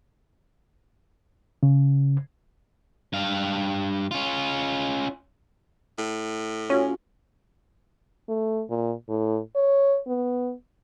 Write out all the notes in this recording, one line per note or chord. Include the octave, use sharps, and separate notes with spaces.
C#3
G2 F5
C#4 F4
A2
C#4 F4 F#4 C#5
A3
A#2
A2
C#5
B3